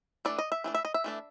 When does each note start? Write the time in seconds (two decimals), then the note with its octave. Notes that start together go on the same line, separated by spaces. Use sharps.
0.25 E3 A3 D4 D5
0.38 D#5
0.52 E5
0.64 E3 A3 D4
0.74 E5
0.85 D#5
0.94 E5
1.04 E3 A3 D4